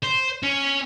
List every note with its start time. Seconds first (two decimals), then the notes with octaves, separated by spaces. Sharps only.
0.03 C5
0.43 C#4